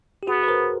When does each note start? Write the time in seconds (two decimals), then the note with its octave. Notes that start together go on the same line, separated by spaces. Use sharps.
0.23 G4
0.27 B3 F#4 G#4
0.43 B4
0.48 A#4 C5